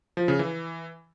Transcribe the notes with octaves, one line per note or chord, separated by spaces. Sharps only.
F3
C#3
E3